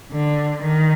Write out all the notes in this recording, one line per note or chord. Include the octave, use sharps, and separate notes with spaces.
D3
D#3